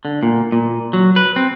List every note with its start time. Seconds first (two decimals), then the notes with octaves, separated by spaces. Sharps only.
0.05 D3
0.23 A#2
0.52 A#2
0.93 F#3
1.16 B4
1.36 C4